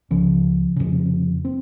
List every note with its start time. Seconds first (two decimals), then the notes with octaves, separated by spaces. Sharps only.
0.11 C#2 C#3 F3
0.76 F1 F2 C#3
1.45 C4